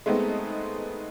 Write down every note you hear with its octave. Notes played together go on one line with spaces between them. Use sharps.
G#3 A3 B3 C4 D#4